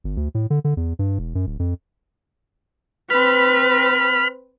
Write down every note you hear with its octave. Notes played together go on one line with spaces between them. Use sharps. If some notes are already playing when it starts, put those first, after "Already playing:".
G1
D2
A2
D3
D3
E2
G2
E1
F#2
D1
F2
C4 B4 B5 F6